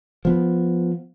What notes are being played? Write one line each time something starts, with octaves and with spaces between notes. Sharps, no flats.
F3 B3